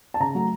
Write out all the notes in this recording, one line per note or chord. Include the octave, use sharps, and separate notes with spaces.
A5
C#3 A#5
F#3 A3